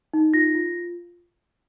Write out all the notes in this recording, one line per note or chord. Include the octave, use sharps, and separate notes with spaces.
D#4
F4 A#6
F4